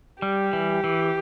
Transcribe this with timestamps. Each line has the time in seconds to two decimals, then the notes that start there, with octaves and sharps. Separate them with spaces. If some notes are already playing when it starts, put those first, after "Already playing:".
0.22 G3 G4
0.53 E3
0.84 E3